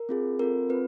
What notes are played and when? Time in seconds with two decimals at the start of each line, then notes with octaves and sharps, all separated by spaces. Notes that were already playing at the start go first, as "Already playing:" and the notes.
Already playing: A#4
0.09 C4 F4 G#4
0.39 C4 F4 A4 A#4
0.70 C4 F4 B4